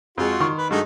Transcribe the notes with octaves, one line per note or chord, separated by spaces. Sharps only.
F2 G#3 F4 F#4
D#3 C6 C#6
B4
G2 G#3 A3 D#4 F#4